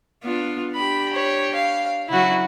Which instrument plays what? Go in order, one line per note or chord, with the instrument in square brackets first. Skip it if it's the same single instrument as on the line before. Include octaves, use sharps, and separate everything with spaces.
[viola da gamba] B3 D4 F4
[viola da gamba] D4 G4 [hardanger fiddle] B5
[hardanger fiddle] C#5
F5
[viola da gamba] C#3 F#3 [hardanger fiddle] E4 F#4